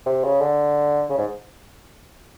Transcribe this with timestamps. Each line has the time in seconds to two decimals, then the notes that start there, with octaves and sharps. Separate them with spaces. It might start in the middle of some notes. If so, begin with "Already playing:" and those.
0.06 C3
0.24 C#3
0.41 D3
1.10 C#3
1.18 G#2